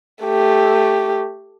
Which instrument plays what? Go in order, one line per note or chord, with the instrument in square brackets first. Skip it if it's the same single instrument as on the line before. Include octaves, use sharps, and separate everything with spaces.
[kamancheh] A3 G4